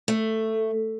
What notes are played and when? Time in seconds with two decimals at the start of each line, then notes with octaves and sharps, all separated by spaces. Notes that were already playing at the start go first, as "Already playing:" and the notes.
0.08 A3